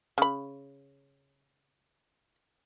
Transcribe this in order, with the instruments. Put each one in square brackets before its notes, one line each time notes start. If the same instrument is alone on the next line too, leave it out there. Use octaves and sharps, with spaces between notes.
[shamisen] C#3 B5